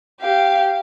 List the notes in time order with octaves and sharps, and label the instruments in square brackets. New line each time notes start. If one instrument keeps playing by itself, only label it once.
[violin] G4 F5